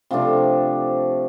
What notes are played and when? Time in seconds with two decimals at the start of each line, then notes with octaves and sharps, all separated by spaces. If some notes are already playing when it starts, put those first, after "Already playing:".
0.11 C3 F3 A3 D4